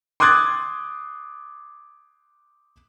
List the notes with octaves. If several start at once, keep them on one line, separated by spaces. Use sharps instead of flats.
C6 D6 D#6 F#6 G#6 A6